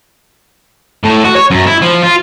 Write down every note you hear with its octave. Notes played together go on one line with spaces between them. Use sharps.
A2
F#4
C#5
F#2
E4
F3
F4